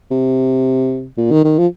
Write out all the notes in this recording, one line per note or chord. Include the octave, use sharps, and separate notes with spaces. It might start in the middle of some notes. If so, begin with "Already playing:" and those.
C3
A#2
D#3
D#3
F3